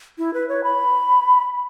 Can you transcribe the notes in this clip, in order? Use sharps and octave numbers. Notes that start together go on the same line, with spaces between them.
E4
B4
C#5
B5